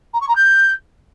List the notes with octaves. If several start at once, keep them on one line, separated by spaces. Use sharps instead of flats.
A#5
C#6
A#5
G6